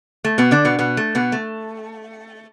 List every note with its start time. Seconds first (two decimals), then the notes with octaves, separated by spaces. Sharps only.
0.24 A3
0.38 B2 B3
0.51 D3 D4
0.65 B2 B3
0.79 B2 B3
0.97 A3
1.15 B2 B3
1.32 A3